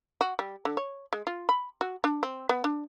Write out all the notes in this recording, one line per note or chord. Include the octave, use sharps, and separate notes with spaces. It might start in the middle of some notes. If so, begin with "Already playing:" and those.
F#4
G3
D3
C#5
G#3
F4
B5
F#4
D4
C4
B3
D4